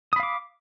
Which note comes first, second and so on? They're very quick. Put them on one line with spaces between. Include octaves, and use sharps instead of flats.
D#6 B5 F5 D6